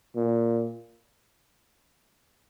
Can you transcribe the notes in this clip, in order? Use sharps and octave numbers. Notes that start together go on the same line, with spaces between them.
A#2